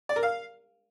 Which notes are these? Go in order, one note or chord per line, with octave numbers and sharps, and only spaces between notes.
D5
A#4
F5